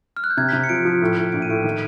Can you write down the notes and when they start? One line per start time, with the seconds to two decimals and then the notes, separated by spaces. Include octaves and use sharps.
0.17 F6
0.24 F#6
0.30 G6
0.37 C3 G#6
0.49 C3 B6
0.64 C#7
0.69 F3 D7
0.85 F3
1.02 A2
1.16 A2
1.32 A#1 D7
1.42 D#7
1.49 A2 D7
1.64 D#3